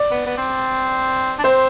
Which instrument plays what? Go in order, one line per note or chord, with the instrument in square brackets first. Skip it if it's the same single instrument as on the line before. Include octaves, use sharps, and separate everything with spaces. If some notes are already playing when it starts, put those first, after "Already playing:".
Already playing: [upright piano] D5
[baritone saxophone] B3
B3
C4
D4
[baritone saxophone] C4 [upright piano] C5